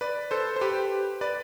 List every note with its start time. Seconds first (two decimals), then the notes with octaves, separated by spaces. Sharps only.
0.01 B4 D5
0.31 A4 C5
0.56 C5
0.61 G4 B4
1.21 B4 D5